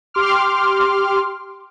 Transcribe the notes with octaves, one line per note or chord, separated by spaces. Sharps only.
G4 C6 D6 F6